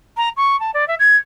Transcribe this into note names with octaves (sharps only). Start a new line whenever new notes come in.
A#5
C#6
A5
D5
E5
G#6